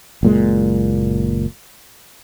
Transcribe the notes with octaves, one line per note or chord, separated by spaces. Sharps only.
F#1 A#2 G#3